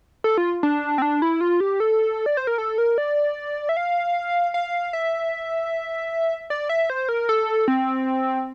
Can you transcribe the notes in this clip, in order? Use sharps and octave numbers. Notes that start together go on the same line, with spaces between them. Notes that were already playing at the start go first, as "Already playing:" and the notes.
A4
F4
D4
C4
D4
E4
F4
G4
A4
D5
C5
A#4
A4
A#4
D5
E5
F5
F5
E5
D5
E5
C5
A#4
A4
C4